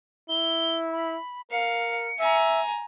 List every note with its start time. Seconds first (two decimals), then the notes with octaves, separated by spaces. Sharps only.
0.29 E4 G7
0.91 B5
1.52 A#4 F5 C#7
2.19 E5 G#5 A#5